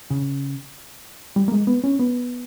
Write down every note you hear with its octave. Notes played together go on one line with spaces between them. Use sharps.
C#3
G3
A#3
G#3
B3
C#4
B3